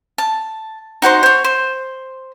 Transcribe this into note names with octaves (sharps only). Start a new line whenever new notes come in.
A5
D#4 F#4 C5 C6
C5 C#5
C5